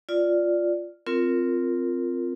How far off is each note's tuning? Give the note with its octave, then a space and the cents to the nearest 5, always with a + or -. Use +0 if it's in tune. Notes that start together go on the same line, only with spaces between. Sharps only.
F4 +0 D5 +0
C4 +0 F4 +0 A#4 -10